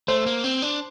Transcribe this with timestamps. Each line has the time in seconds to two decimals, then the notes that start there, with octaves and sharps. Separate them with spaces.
0.08 A3 C5
0.26 A#3
0.44 C4
0.62 D4